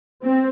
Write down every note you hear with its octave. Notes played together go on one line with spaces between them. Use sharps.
C4